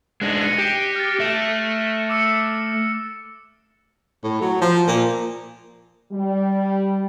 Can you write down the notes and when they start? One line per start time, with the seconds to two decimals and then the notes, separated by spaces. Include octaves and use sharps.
0.22 G#3 D4 D#4 F#6 A#6
0.41 A#6 C#7 D#7
0.58 G4 C7 D7 E7
0.96 F6 A6
1.20 A3 E5 D7 E7
2.10 D6 E6 C#7
4.24 A2
4.41 F#3
4.61 F3
4.87 A#2
6.12 G3